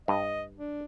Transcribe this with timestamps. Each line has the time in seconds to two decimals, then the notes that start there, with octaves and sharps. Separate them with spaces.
0.08 G2 D#5
0.57 D4